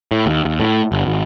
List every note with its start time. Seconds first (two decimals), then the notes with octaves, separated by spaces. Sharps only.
0.11 A2
0.26 D#2
0.45 D#2
0.60 A2
0.92 G1
1.07 G#1